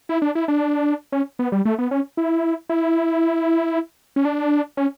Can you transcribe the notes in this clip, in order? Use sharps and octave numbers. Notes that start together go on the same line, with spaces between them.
E4
D4
E4
D4
C#4
B3
G3
A3
B3
C#4
E4
E4
C#4
D4
C#4